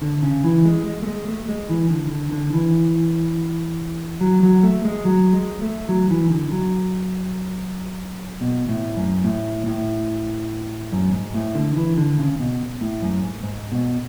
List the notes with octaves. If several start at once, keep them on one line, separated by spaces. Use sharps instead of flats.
D3
C#3
E3
G#3
G#3
A3
G#3
A3
G#3
E3
D3
D3
D3
E3
F#3
F#3
A3
G#3
F#3
G#3
A3
F#3
E3
D3
F#3
B2
A2
F#2
A2
A2
F#2
G#2
A2
D3
E3
D3
C#3
B2
A2
F#2
G#2
G#2
B2